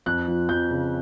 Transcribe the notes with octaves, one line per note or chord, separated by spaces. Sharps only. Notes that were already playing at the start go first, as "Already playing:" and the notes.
F2 F#6
F3
F2 G6
C#3